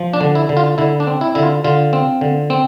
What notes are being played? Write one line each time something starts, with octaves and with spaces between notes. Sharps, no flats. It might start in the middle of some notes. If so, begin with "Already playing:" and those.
Already playing: F3
D4
D3
E4
D3
F4
D3 E4
D4
C4
E4
D3 E4
F4
D3 F4
C4
D3
C4